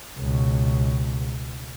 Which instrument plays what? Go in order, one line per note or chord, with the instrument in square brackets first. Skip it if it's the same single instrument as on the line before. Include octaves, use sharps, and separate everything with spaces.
[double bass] C#2 B2